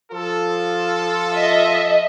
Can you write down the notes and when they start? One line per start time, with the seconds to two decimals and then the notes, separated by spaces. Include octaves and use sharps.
0.11 F3 F4 A4
1.35 D#5 E5